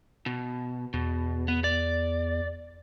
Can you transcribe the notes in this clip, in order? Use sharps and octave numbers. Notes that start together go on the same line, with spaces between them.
B2
E2 B2
B3
D5